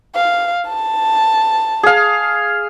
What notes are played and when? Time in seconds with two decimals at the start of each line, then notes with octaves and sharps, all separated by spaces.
0.15 F5
0.67 A5
1.83 G#4 F5